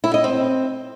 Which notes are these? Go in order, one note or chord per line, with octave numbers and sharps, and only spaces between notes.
E4
D#5
C4